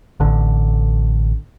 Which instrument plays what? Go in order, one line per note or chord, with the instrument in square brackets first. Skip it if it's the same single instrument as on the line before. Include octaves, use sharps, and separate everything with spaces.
[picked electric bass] A1 D3